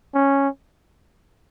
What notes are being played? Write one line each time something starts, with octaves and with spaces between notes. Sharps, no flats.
C#4